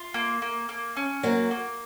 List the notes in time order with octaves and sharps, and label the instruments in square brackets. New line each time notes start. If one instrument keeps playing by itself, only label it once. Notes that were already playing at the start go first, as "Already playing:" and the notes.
Already playing: [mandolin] F4
A#3
A#3
A#3
C#4
[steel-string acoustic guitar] F#3 A#3 [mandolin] F#4
[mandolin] A#3